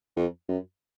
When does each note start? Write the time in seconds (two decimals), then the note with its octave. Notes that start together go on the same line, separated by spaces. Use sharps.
0.16 F2
0.48 F#2